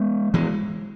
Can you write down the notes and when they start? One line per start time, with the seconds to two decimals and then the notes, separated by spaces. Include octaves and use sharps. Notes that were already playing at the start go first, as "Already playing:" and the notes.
Already playing: G#3 B3
0.34 E3 G#3